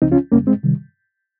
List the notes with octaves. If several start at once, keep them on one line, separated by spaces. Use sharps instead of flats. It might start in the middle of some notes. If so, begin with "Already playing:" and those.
C#2 C#3 F3 C4 D#4
C#4 F4
F2 C#3 G3 A#3 C#4
G#3 C4
C3 D#3 G3